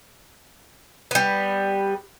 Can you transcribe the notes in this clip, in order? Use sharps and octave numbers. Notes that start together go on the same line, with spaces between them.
G3 B3